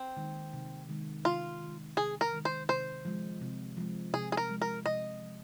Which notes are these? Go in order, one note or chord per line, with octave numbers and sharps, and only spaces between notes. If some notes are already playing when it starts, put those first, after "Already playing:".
Already playing: C4
D#3 G#3
C3
D#3 G#3
C3 F4
D#3 G#3
C3 G#4
A#4
D#3 G#3
C5
C3 C5
F3 G#3
C3
F3 G#3
C3 G#4
G#4
A#4
F3 G#3
A#4
C3 D#5
F3 G#3